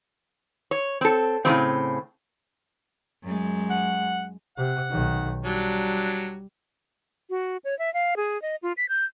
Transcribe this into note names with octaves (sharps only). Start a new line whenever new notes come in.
C#5
C4 A4
A2 C#3 G3 C4
F#2 G#3
F#5
C3 F#5
B1 D#3
F#3 G3 D4
F#4
C#5
E5
F5
G#4
D#5
F4
B6
G6